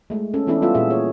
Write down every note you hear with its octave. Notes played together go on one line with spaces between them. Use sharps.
G#3 A3
C#4 A4
E3 B3 C#4 D4 E4 A4
G3 B3 F4 A4 E5
A#2 G#4 E5
G#4 C#5